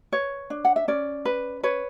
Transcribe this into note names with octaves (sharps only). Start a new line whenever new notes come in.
B4 C#5
D4
F#5
E5
C#4 D5
B4
B4 C#5